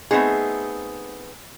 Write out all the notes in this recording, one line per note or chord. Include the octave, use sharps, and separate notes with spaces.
A3 B3 C4 D#4 G#4